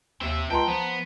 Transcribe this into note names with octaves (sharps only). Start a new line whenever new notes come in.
D#2 C4 E5
C#2 G5 A5 A#5 C6
F3 B3